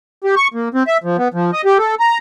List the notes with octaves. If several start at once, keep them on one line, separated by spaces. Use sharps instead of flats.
G4
C#6
A#3
C4
E5
F3
B3
F3
D#5
G4
A4
A#5